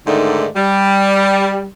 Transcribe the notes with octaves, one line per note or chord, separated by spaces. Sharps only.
G#2 D3 D#3 A3 D5
G3